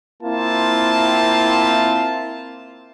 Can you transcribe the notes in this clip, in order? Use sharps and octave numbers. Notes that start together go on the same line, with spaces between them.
A#3 C4 E4 F4 A5